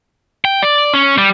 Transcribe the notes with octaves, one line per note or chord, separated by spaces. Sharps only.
G5
D5
C#4
G3